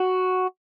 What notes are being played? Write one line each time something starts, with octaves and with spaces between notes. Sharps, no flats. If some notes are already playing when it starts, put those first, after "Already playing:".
Already playing: F#4